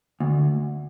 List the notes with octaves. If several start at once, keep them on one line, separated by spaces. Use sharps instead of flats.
D2